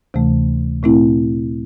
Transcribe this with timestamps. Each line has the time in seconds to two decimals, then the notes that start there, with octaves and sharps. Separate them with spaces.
0.14 D2 C3 E3 A3
0.83 A#2 A3 C4 E4